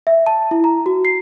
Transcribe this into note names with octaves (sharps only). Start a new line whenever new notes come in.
E5
A5
E4
A#5
F#4
C7